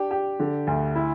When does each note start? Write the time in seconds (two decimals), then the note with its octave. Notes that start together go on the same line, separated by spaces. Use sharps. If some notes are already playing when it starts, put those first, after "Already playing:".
Already playing: D4 G4
0.11 G4
0.40 D3
0.67 D2
0.95 E4